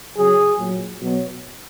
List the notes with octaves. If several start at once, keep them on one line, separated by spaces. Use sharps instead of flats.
C#3 F#3 G#4
A#2 F#3
B2 F#3